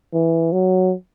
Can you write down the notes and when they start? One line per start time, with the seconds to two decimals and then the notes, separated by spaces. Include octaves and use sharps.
0.13 E3
0.52 F#3